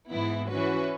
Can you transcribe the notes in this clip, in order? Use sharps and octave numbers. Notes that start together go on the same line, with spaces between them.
G#2 E3 B3 E4
E3 C#4 F#4 B4